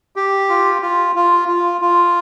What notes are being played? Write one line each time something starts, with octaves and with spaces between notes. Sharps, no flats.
G4
F4
F4
F4
F4
F4